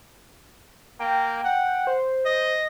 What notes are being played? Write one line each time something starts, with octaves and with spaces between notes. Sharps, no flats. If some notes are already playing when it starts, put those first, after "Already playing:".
A#3 G5
F#5
C5
D#5